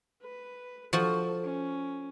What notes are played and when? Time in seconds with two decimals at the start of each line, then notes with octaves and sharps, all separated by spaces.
0.22 B4
0.93 F3 F#4 A4
1.44 C#4